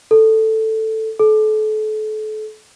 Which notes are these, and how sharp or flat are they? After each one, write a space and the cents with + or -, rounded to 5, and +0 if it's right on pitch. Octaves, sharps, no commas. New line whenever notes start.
A4 +5
A4 -35